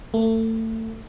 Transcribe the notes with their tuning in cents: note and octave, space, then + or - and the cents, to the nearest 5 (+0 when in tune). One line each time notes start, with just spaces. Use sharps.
A3 +30